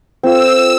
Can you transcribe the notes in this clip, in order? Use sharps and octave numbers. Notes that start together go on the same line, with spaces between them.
C4 F4 A4 E6